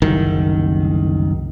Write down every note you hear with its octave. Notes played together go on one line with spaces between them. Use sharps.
F#1 C2 D#3